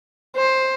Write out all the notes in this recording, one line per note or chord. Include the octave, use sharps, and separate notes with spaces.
C5